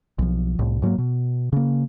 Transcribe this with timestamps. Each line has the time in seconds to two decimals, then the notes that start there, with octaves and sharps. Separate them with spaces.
0.19 B1 F3
0.59 C2 A2
0.82 G#2 F#3 A3 A#3
0.98 B2
1.52 C#3 A#3